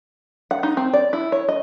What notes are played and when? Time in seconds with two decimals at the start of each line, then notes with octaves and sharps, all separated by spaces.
0.51 F#5
0.63 D#4
0.77 C4
0.93 D5
1.13 E4
1.32 C#5
1.48 D#5